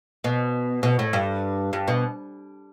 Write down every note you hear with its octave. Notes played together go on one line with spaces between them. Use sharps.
B2
B2
A2
G2
G2
B2